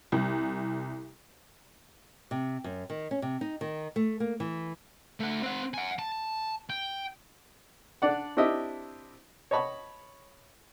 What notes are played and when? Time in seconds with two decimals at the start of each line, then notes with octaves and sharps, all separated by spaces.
0.12 C2
2.31 C3
2.64 F#2
2.90 D#3
3.11 C#4
3.22 C3
3.41 D#4
3.61 D#3
3.96 A3
4.20 A#3
4.40 E3
5.20 A3 F#5
5.42 C4 F#5
5.74 F#5 G#5
5.99 A5
6.70 G5
8.02 D4 D5 F#5
8.37 C4 D4 E4 G4 D#5 E5
9.51 C#5 D#5 A5 B5 C#6